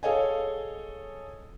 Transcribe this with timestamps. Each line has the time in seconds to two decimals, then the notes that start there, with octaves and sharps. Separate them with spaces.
0.03 G#4 A4 C#5 D#5 F5 G#5